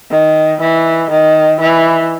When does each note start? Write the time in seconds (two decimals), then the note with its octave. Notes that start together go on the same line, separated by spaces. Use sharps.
0.11 D#3
0.61 E3
1.11 D#3
1.60 E3